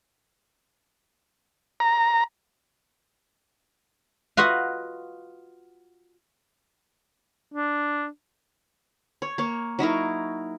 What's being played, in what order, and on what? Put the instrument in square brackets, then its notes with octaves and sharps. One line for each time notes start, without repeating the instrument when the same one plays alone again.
[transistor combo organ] A#5
[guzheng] F4 F#4 B4 D#5 F5 F#5
[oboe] D4
[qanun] C#5
A#3 C#5
F#3 D#4 E4 A#4